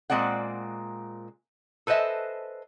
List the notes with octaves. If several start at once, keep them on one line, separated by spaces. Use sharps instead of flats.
A#2 G#3 C4 D5 F#5
A4 B4 C5 D#5 E5 G#5